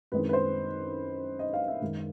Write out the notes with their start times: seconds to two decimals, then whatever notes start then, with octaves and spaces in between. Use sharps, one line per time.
0.12 F#2 D#3 G#3 C4 E4 B4
0.29 B4
0.33 C5
1.39 D#5
1.54 F5
1.68 E5
1.82 F#2 D#3 G#3